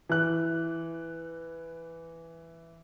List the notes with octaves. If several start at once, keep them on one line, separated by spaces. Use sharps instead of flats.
E3 F#6